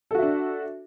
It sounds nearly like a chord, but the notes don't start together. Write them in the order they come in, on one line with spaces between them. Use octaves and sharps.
A4 F#4 E5 D4